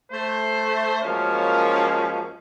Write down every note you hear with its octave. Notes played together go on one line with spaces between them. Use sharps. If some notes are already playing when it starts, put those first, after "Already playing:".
A3 C5
F#2 F3 G#3 A#3 C#4